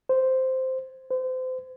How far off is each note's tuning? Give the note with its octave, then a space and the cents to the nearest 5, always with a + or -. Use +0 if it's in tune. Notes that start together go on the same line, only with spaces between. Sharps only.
C5 -5
C5 -30